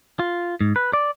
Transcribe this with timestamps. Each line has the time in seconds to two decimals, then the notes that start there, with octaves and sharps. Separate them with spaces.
0.19 F4
0.61 G#2
0.76 B4
0.93 D5